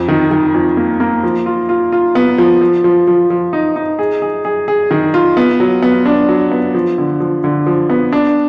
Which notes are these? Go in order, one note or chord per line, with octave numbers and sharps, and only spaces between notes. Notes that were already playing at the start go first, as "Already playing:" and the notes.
Already playing: F2
D#3
D#3
F2
A#3
A#3
F3
F4
F4
F4
B3
F3
F3
F3
F3
F3
D#4
D#4
G#4
G#4
G#4
G#4
D#3
F4
B3
F#3
B3
D4
F#3
B3
F3
D3
F3
D3
F3
B3
D4